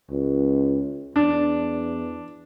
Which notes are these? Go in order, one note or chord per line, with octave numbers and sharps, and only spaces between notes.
C#2
E2 D4